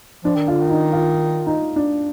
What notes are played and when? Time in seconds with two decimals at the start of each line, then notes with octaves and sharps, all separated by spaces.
0.25 F3 D4
0.36 D#3
0.48 D3 F4
0.60 D#3
0.70 D#4
0.93 F4
1.47 D#4
1.76 D4